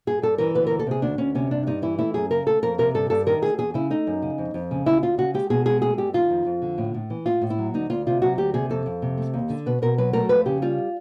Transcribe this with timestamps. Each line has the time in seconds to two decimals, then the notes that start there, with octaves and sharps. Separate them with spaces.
0.07 G2 G#4
0.22 G2 A4
0.38 E3 A#4
0.55 D2 B4
0.67 A#4
0.71 D2
0.79 A4
0.87 C3 G#4
1.02 D2 D4
1.18 D2 C#4
1.35 C3 C#4
1.51 G2 D4
1.67 G2 D#4
1.82 E3 E4
1.99 A3 E4
2.14 F#2 G#4
2.31 C#3 A#4
2.46 A3 A4
2.63 F2 A#4
2.78 C3 A#4
2.94 G2 A4
3.10 G2 A4
3.27 D#3 A#4
3.42 A3 G#4
3.58 E2 G#4
3.74 C#3 E4
3.90 A3 D#4
4.07 F#2
4.22 C#3
4.38 F2
4.54 F2
4.71 C#3
4.86 D2 E4
5.02 D2 F4
5.18 C#3 F#4
5.34 G#3 G4
5.50 B2 G#4
5.66 G#3 G#4
5.82 A3 G#4
5.98 G2 G4
6.14 D#3 F4
6.30 F2
6.46 F2
6.62 D3
6.78 A2
6.94 A2
7.10 E3
7.26 A2 F4
7.42 A2
7.50 E4
7.58 F#3
7.74 D2 D#4
7.90 D2 F4
8.07 C3 F4
8.22 F#3 F#4
8.38 D2 G4
8.54 C3 G#4
8.69 F2 A4
8.86 F2
9.02 C3
9.18 A3
9.34 D#2
9.50 D3
9.66 B2 B4
9.82 B2 A#4
9.98 F#3 B4
10.13 A3 A#4
10.29 F2 B4
10.46 C#3 G4
10.62 G3 F4